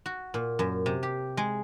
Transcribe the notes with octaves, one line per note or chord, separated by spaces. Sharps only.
F#4
A#2
F#2
C3
G4
G#3